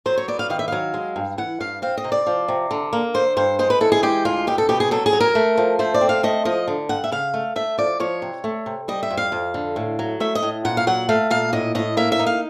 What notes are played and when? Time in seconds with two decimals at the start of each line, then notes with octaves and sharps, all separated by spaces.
0.06 F#3 C5
0.17 C#5
0.28 B3 D5
0.39 F5
0.50 D#3 F5
0.59 E5
0.68 F#3 F5
0.94 G#3
1.16 G2
1.38 E3 F#5
1.60 G2 F5
1.82 C4 F5
1.97 D#5
2.04 C3
2.12 D5
2.27 F3
2.48 C3
2.71 D3
2.93 A#3
3.14 D3 C5
3.37 G2 C5
3.59 G#3 C5
3.70 B4
3.81 E3 A4
3.92 G#4
4.03 G#3 G4
4.25 D2 F4
4.47 B2 G4
4.58 A4
4.69 B2 G4
4.80 G#4
4.91 F#3 A4
5.06 G#4
5.13 F#3
5.20 A#4
5.35 A3
5.57 F3
5.79 A3 C5
5.94 D5
6.01 C4
6.09 F5
6.23 A3 D#5
6.45 F3 D#5
6.67 D3
6.89 G2 F#5
7.04 E5
7.12 C#3 F5
7.34 A3
7.56 A3 E5
7.78 F3 D5
8.00 F3 C#5
8.22 C3
8.44 A3
8.66 C3
8.88 G3 D#5
9.03 E5
9.10 F2
9.17 F5
9.32 F2
9.54 D3
9.76 A2
9.99 F#3
10.20 A3 E5
10.35 D#5
10.43 A2
10.65 A#2 F#5
10.77 F5
10.87 F#3 F#5
11.09 A3 F5
11.30 A#2 F5
11.53 A2 D#5
11.75 A2 D#5
11.97 A#3 E5
12.12 E5
12.19 D#4
12.26 F5